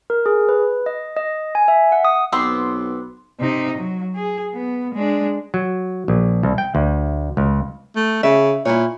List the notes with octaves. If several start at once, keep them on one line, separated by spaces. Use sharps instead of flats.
A#4
G#4
B4
D#5
D#5
G#5
E5
F#5
D#6
B1 B3 C4 C6 D6 E6
C3 D#4
F#3
G#4
B3
G#3 D4
F#3
A#1
C2
G5
D2
C#2
A3
C#3 E5
A#2 E4 C#5